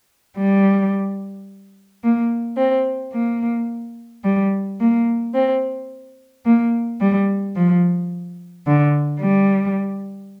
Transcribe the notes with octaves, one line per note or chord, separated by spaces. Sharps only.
G3
A#3
C4
A#3
G3
A#3
C4
A#3
G3
F3
D3
G3